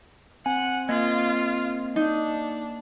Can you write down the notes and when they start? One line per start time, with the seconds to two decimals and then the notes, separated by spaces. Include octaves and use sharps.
0.46 C4 F#5 G#5
0.89 A#3 F4 D#5 G#6
1.96 D4 D#4